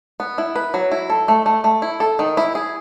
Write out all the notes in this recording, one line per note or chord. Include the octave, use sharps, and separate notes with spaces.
B3
E4
B4
F#3
E4
A4
A3
A3
A3
E4
A4
D#3
E4
G#4